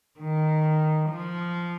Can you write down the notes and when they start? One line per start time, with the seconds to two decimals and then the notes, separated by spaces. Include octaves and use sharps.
0.20 D#3
1.10 F3